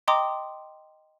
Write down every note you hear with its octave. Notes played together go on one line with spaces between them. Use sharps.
D#5 G5 A#5 C6 D6 D#6